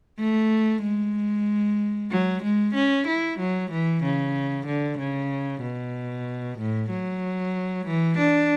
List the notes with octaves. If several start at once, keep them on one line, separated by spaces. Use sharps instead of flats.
A3
G#3
F#3
G#3
C#4
E4
F#3
E3
C#3
D3
C#3
B2
A2
F#3
E3
D4